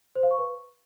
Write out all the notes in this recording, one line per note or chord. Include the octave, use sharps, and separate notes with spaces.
C5
F5
C#6
B4